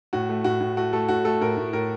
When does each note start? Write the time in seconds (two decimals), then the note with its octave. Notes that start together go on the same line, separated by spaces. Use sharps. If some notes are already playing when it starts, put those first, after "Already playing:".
0.13 A2 F#4
0.29 A3
0.44 A2 F#4
0.61 A2
0.77 A3 F#4
0.93 A3 A4
1.09 A2 F#4
1.25 A3 A4
1.41 A2 A#4
1.57 A2
1.73 A2 A#4